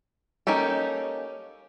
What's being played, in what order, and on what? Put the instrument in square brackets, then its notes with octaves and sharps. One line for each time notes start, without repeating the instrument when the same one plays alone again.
[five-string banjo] A#3 C#4 D#4 G4 A4